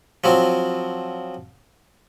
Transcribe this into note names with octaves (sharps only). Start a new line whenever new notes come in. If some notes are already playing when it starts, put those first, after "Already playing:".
F3 F#3 C4